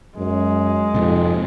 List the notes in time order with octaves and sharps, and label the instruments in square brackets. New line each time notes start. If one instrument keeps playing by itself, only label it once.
[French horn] F#2 [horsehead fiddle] G#3
[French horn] F2 [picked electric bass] G#2 C3